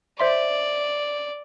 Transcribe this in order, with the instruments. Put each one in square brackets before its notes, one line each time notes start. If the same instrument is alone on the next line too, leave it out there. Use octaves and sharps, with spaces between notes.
[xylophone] C5 E5 C6 [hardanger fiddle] D5